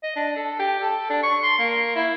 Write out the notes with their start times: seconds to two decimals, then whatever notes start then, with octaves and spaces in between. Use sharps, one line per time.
0.03 D#5
0.16 D4
0.36 A4
0.59 G4
0.82 A4
1.10 D4
1.23 C#6
1.43 C6
1.59 A#3
1.96 E4